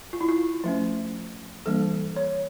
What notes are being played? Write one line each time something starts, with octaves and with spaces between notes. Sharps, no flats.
F4
E4
F4
F3 A3 C#4
E3 G3 A#3 D4 A4
C#5